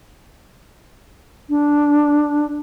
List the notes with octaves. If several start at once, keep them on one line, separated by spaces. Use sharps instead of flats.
D4